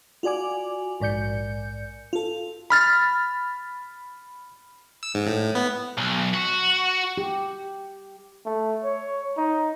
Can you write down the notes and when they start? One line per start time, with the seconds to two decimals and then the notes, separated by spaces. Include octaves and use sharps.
0.23 F4 F#4 D5 G#5 D6
1.00 A#1 G#2 D5 G6 C#7
2.13 F4 A4
2.70 B5 F6 A6
5.03 E6
5.14 G#2
5.27 A2
5.55 B3
5.98 B1
6.34 F#4
7.18 G4
8.46 A3
8.84 C#5
9.37 D#4